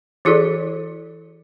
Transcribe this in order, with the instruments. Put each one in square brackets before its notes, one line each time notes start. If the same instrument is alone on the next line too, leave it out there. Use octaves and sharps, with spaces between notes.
[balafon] E3 E4 F#4 G#4 A4 D5